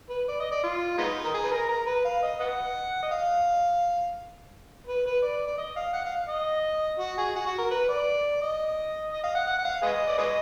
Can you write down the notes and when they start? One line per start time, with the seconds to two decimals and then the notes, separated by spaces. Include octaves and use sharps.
0.10 B4
0.28 D5
0.40 D#5
0.52 D5
0.64 F4
0.98 G#3 B3 D#4
1.24 A#4
1.34 G#4
1.44 B4
1.52 A#4
1.69 A#4
1.86 B4
2.05 F5
2.23 D#5
2.40 B4 D#5 F#5
3.03 D#5
3.11 F5
4.87 B4
5.06 B4
5.22 D5
5.47 D5
5.58 D#5
5.76 F5
5.93 F#5
6.05 F5
6.28 D#5
6.99 F#4
7.18 G#4
7.36 F#4
7.46 F#4
7.58 A#4
7.71 B4
7.89 D5
8.41 D#5
9.12 D#5
9.23 F5
9.35 F#5
9.47 F#5
9.59 F#5
9.65 F5
9.82 G#4 B4 D#5
10.07 D5
10.18 G#4 B4 D#5